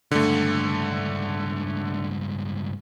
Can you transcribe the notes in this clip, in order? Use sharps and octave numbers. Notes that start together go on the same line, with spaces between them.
C#2 G2 D3 A3